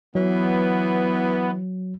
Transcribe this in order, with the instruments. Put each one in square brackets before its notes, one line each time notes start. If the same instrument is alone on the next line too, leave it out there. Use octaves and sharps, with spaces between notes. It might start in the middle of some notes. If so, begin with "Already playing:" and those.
[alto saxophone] E3 [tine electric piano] F#3 [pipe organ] B3